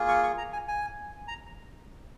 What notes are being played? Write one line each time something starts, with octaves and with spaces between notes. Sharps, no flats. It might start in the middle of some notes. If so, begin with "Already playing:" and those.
Already playing: A#3 F4 G#4
C#6
C#6
A#5
G#5
G#5
A#5